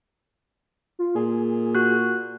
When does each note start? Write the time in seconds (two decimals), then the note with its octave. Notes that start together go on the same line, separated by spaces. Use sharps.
0.99 F4
1.16 A#2 G#4
1.75 F#4 F#6